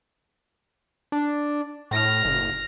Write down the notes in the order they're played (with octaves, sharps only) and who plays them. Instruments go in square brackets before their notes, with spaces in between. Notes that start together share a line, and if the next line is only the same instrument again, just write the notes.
[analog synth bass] D4
[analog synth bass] A2 [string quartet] F6 A#6
[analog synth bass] F#1